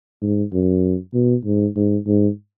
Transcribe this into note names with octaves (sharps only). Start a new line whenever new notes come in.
G#2
F#2
B2
G#2
G#2
G#2